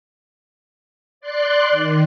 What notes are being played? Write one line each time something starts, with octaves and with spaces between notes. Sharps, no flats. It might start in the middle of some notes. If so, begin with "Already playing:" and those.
D5 C6 F#6
D#3